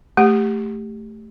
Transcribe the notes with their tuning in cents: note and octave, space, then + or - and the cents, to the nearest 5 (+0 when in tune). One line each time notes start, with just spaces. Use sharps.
A3 +0 G4 +10